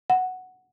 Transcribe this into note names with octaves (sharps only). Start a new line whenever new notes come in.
F#5